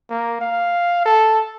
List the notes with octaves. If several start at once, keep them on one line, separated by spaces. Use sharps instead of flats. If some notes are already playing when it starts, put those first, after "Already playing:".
A#3
F5
A4